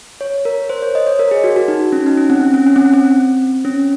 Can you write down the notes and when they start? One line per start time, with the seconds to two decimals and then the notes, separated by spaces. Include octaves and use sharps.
0.21 C#5
0.45 A#4
0.70 C5
0.82 C#5
0.95 D#5
1.07 C#5
1.19 A#4
1.31 G#4
1.44 F#4
1.56 F#4
1.68 D#4
1.93 C#4
2.06 D#4
2.17 C#4
2.30 C4
2.41 C#4
2.54 C#4
2.67 C#4
2.76 C4
2.94 C4
3.65 C#4